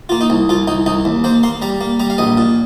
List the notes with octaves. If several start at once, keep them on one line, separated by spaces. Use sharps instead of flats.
A#3 F4
D#4
C2
C2 F4
C2 D#4
C2 D#4
D#2
A#3 C5
A#3 C6
G3 A#5
A#3
G3 A#5
F5
A#1 D#5
A#2